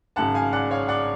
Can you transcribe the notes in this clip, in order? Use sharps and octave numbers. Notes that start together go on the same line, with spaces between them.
G#1 F#2 C#3 F#5 A5
F5 G#5
D5 F#5
C#5 F5
D5 F#5